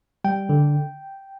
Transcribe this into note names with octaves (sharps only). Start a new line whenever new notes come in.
G3 G5
D3